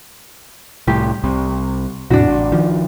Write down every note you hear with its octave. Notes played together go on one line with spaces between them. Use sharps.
C2 A2 G4
C2 C3
E2 A2 C3 D4 F#4
A1
D#3 F3